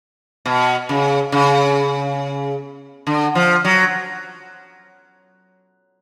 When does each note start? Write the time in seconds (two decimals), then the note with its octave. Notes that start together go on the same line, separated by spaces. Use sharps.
0.46 B2
0.89 C#3
1.32 C#3
3.07 D3
3.35 F3
3.65 F#3